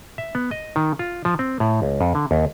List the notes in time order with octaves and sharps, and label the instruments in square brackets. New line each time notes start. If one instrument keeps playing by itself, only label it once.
[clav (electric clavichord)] E5
B3
D#5
D#3
F4
F3
C4
A2
C#2
F2
D3
D#2